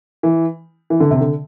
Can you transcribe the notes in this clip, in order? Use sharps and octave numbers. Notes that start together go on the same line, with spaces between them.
E3
E3
D3
C3
D3